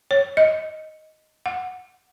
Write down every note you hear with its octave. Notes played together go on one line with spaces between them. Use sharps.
C#5
D#5
F#5